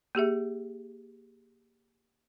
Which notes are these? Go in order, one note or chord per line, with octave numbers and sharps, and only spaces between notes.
A#3 G4 G#4 E5